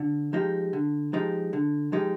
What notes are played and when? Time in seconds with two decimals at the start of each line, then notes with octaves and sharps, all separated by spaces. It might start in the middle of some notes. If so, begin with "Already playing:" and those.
Already playing: D3
0.33 F3 G#3 D#4 G4
0.73 D3
1.13 F3 G#3 D#4 G4
1.53 D3
1.92 F3 G#3 D#4 G4